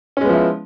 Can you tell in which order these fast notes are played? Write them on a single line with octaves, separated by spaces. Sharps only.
C#4 G#3 B3 F3 E4